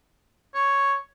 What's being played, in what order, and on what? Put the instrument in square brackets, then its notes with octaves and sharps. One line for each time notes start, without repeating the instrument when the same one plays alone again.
[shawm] C#5